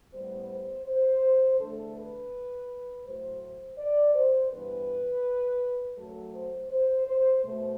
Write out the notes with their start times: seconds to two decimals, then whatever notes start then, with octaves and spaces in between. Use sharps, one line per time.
0.13 A2 G3 B3 C5
0.50 C5
0.86 C5
1.59 E2 D3 A3 A4
1.95 B4
3.05 A2 F#3 A3 C5
3.42 C5
3.78 D5
4.14 C5
4.51 G2 E3 G3 B3 B4
5.97 F#2 F#3 A3 A4
6.34 C5
6.71 C5
7.06 C5
7.43 B2 A3 C5